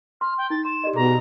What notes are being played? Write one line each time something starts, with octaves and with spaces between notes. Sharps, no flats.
C6 F6
G5
D#4 A6
C6 E7
G4 D5 D#5
B2 G#4 A#5